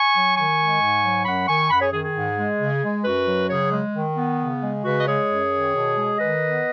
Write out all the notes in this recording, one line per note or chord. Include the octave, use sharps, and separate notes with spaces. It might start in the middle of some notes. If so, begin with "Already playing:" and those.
Already playing: G#5 C#6
F#3
D#3 G#5 C#6
G#3
G#2
F#3
F#2 F#5 B5
D#3 G#5 C#6
F#2 F#5 B5
G#4 C#5
D#3 G#4
G#4
G#2
G#3
C#3
G#3
F#2 F#4 B4
F#3
C#3 G#4 C#5
G#3
D#3
B3
C#3
G#3
C#3 F#4 B4
D#5
G#3 G#4 C#5
F#2
D#3
B2
G#3
D#3 B4 D#5
B3